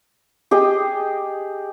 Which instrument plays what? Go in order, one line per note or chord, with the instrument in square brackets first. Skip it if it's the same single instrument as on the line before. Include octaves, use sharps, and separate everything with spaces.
[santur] G4 G#4 D#5